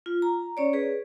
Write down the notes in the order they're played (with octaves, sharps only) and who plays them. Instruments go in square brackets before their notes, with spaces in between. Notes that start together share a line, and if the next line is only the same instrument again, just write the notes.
[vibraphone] F4
A#5
C#4 C#5 D5
G#4 B4